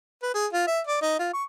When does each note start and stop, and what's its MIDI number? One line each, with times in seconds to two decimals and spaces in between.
0.23 0.30 71
0.35 0.47 68
0.53 0.65 65
0.67 0.81 76
0.87 1.01 74
1.02 1.18 63
1.19 1.29 65
1.33 1.44 85